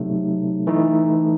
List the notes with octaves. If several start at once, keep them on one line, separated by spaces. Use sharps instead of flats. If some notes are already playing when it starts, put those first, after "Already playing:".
Already playing: C3 F#3 A3 D#4
E3 A3 D#4